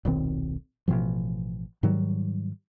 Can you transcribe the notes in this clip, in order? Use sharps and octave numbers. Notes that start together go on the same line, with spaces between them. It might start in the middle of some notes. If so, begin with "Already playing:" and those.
D#1 B1 D#3 C4
A1 B2 D#3 F3
G#2 D#3 F#3 G3